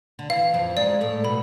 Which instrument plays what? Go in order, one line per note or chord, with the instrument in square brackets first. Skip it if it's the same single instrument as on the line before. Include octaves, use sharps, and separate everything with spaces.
[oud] D3
[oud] E3 [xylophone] F5
[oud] F2 F3
[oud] G#2 G#3 [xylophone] D5
[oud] A2 A3
[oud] B2 B3 [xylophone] B5